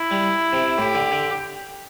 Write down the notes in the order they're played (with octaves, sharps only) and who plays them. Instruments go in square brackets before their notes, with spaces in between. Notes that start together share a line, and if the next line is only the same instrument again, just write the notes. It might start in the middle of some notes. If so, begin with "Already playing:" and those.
Already playing: [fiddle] E4
[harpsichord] G3
C3
[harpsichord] A2 [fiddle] G4
[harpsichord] D3
D3